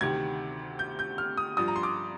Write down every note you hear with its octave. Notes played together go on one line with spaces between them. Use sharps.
D2 C3 D#3 G#6
G6
G6
F6
D#6
G2 F3 D#6
A#5
C6
D6